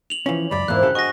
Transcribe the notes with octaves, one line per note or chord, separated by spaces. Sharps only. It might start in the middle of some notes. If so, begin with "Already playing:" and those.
F7 F#7
E3 F3 C#4 C#5
C#2 F#2 D5 B5
E2 G#2 A#3 E4 F4 C5 F#6
G2 C#3 G4 A4
F#4 G#4 D#5 C#6 A#6